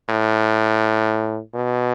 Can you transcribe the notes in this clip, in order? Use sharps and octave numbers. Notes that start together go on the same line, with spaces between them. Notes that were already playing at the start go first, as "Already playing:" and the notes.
A2
B2